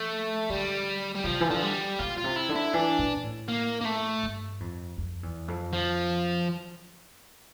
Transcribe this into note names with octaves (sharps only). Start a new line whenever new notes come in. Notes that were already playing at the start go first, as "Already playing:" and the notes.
Already playing: F3 A3
D3 G3
G3
C3 F3
E3
D3 F3
G3
A#2 F4
F4
C3
E4
D3
E4
E3 D4
A#2
A2
A#3
A#3
A3
G2
F2
F2
E2
F2
F3